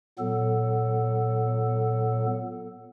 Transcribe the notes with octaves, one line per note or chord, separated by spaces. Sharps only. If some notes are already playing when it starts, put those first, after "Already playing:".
A#2 F#3 B3 A4